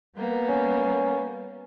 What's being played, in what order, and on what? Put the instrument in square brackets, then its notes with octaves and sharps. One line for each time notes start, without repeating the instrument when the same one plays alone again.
[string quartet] G3 A#3 B3
[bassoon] C#4